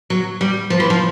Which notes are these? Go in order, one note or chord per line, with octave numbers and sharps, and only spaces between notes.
F#3
G3
F3
E3
F3